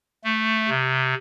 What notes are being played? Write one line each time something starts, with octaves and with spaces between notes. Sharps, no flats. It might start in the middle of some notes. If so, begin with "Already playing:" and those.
A3
C3